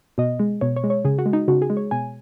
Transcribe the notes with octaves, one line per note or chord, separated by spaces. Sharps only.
B2 D#5
G#3
B2 C#5
C#5
G#3
C#5
C#3 G#4
F#4
G#3
D#4
C#3 F#4
G#4
G#3
C#5
B2 G#5